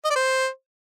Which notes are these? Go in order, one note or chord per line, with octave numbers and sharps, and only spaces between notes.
D#5
D5
C5